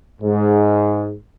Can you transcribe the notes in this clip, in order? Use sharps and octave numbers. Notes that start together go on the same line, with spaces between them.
G#2